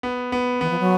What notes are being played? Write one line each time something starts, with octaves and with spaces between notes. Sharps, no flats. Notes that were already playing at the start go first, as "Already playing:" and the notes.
B3
B3
E3 B3
F3
F#3